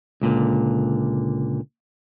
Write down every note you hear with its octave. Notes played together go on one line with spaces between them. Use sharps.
C#2 A#2 D3